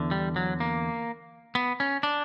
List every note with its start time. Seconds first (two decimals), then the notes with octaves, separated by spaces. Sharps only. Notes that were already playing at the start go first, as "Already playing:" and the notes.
Already playing: E2 D3
0.11 G3
0.36 F#3
0.60 A#3
1.55 B3
1.80 C#4
2.03 D4